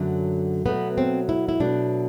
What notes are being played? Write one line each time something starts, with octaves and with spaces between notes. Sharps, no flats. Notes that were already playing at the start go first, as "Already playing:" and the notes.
Already playing: F#2 D3 F#3 A3
B2 F#3 A3 B3
C4
E4
E4
B2 F#3 A3 D4